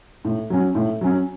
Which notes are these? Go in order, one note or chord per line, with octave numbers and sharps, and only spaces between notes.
A2
F#3 C#4
A2
F#3 C#4